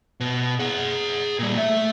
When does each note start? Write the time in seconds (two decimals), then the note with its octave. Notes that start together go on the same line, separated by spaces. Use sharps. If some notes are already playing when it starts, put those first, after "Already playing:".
0.20 B2
0.60 G#4 F#5
1.39 A#2 G3
1.57 A3 E5